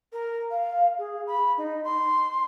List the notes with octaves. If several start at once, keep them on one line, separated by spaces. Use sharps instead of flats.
A#4
F5
G#4
B5
D#4
C6